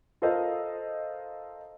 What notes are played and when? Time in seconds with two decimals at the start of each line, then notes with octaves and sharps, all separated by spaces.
0.22 F4 A4 A#4 C5 D#5 F5